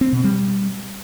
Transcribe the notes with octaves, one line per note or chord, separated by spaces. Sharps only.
C4
B2
G3